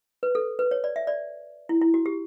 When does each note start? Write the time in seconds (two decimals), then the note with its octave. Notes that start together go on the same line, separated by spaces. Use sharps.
0.23 B4
0.35 A4
0.59 B4
0.71 C#5
0.84 D5
0.96 E5
1.07 D5
1.69 E4
1.81 E4
1.94 F#4
2.06 G4